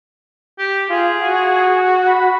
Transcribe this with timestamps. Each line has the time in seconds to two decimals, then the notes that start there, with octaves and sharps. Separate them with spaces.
0.58 G4
0.90 F4 G#4
1.20 F#4
2.07 B5